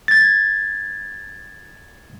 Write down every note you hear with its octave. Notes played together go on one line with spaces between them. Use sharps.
G#6 A6